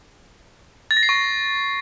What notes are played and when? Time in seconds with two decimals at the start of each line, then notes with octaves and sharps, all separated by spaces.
0.91 A6
0.97 A#6
1.03 C7
1.09 C#6